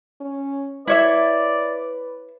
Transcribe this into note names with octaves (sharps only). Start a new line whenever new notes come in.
C#4
E4 B4 C#5 D5 E5